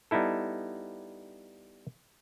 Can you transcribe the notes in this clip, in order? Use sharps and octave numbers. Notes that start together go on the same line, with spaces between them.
G3 B3 D#4 E4 A4